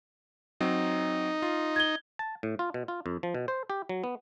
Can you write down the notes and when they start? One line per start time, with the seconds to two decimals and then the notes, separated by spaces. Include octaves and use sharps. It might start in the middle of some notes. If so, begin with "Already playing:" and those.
0.61 F#3 C4 D#4
1.42 F4
1.76 G#6 G7
2.19 A5
2.43 A2
2.59 F4
2.74 B2
2.88 F4
3.06 F2
3.23 F3
3.34 B2
3.48 C5
3.70 G4
3.89 F#3
4.04 B3